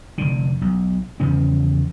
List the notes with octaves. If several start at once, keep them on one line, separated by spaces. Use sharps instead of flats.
F1 D3
B1
E2 C#3 F3 C#4